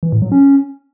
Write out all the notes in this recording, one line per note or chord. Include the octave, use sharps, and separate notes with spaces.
E3
A2
F#3
C#4